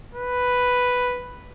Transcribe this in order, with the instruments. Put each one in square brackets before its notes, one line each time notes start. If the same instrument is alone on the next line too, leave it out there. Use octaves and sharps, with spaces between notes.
[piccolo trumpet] B4